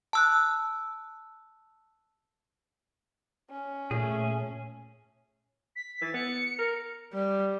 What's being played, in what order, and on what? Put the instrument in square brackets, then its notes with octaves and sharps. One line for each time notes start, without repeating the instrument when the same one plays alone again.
[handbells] A5 E6 F#6
[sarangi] C#4
[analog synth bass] A#2 [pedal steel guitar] A3 G#4
[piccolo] B6
[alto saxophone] E3 [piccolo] A6
[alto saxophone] B3 [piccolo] C#7
[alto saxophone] A#4
[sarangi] G3